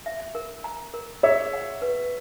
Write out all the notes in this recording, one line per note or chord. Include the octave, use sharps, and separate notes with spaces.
E5
A#4
A#5
A#4
G#4 C#5 E5
F#5
B4